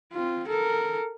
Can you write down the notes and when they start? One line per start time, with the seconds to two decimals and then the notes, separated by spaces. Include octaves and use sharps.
0.13 C4 F4
0.48 A4 A#4